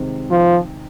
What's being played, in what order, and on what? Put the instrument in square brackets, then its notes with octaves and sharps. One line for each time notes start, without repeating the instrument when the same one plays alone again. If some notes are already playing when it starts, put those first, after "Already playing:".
Already playing: [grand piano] C3 D#3 G#3 C4
[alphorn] F3